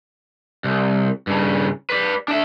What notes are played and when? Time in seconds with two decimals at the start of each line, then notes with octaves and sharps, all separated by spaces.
0.64 C2
1.27 G2 C#3
1.90 B4 D5
2.28 D4 E5